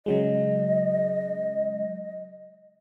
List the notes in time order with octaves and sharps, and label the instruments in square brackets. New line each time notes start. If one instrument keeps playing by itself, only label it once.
[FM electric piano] C#3 F#3 G#3 [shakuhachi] D#5